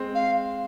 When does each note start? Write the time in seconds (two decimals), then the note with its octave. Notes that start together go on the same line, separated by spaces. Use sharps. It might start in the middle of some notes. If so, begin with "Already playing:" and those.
Already playing: G#3 C4
0.15 F5